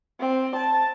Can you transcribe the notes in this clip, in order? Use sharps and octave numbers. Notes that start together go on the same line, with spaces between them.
C4
A5